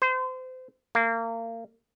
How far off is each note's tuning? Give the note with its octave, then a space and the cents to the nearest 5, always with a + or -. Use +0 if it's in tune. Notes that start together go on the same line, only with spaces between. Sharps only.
C5 -30
A#3 -30